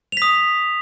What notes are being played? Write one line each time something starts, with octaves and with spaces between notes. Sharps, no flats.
D#6 B6 F7